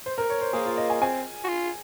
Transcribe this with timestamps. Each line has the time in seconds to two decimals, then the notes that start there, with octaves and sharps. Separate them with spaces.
0.06 C5
0.18 A#4
0.30 C#5
0.41 C5
0.53 A#3 G#4
0.66 F4
0.78 D#5
0.90 G#5
1.02 C4 G#5
1.44 F#4
1.48 F4